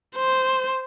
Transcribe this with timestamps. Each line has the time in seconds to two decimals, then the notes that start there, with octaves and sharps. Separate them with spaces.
0.16 C5